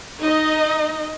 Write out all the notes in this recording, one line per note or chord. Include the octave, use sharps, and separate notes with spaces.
D#4 D#5